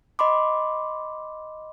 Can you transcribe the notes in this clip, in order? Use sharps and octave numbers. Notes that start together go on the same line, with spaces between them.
D#5 B5 C6 D6